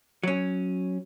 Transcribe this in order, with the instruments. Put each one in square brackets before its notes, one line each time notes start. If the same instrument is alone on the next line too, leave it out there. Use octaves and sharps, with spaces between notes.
[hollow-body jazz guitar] F#3 C#4